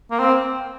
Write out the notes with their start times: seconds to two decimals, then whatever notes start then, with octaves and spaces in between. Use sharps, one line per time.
0.11 A#3
0.20 C4